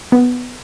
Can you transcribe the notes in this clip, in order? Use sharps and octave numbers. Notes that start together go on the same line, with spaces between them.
B3